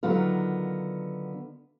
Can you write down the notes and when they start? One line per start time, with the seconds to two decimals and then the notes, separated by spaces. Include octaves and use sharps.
0.03 D3 D#3 F#3 B3 F4 A#4